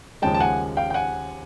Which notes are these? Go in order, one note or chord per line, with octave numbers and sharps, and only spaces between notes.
D#2 C#3 F3 G#3 G5 A5
A5
F#5 G#5
F5 G5
G5
F#5 G#5